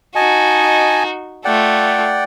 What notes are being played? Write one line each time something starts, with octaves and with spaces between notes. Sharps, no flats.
D#4 F#4 D#5 G#5 A5
A3 F4 D5 F#5 G5